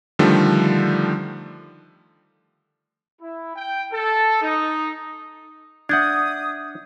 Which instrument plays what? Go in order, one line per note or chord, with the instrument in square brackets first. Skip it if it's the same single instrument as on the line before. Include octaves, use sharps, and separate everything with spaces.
[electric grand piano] D3 D#3 F3 G3 A3
[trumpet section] E4
G5
A4
D#4
[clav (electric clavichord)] D4 F#5 [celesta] E5 G6 G#6 [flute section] D#6